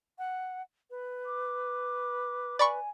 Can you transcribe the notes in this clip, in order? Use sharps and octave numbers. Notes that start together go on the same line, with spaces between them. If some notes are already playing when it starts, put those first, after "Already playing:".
F#5
B4
D6
D5 G#5 B5 C#6